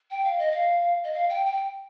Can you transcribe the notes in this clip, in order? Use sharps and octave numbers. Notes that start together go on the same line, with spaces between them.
G5
F5
D#5
F5
D#5
F5
G5
G5